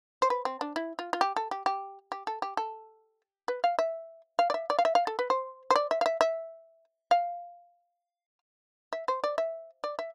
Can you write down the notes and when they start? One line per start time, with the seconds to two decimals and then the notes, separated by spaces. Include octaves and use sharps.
0.22 C5
0.30 B4
0.45 C4
0.61 D4
0.76 E4
0.99 F4
1.13 F4
1.21 G4
1.37 A4
1.51 G4
1.66 G4
2.12 G4
2.27 A4
2.42 G4
2.57 A4
3.48 B4
3.64 F5
3.79 E5
4.39 F5
4.50 D5
4.54 E5
4.70 D5
4.79 F5
4.85 E5
4.95 F5
5.07 A4
5.19 B4
5.30 C5
5.71 C5
5.76 D5
5.91 E5
6.01 F5
6.06 E5
6.21 E5
7.11 F5
8.93 E5
9.08 C5
9.24 D5
9.38 E5
9.84 D5
9.99 E5